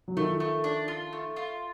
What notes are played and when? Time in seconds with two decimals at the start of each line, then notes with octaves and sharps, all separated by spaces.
0.08 F#3
0.16 D#3 F3 A3
0.40 A3
0.64 D4
0.88 F4
1.13 A3
1.36 F4